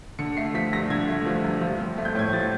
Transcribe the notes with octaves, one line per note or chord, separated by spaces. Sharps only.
D3 C#7
A3 C7
F3 B6
G2 A#6
D3 G#6
A3
F3
G2
F3
C4
A3
G6
A2 G#6
F3 A6